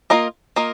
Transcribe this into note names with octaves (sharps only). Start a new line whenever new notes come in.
A#3 F4 A#4 D#5
A#3 F4 A#4 D#5